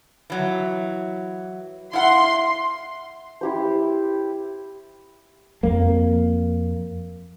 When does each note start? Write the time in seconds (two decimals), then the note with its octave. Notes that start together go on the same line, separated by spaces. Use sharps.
0.30 E3 F#3
1.93 E4 F5 F#5 C6
3.41 E4 G4 C5
5.63 F2 A#3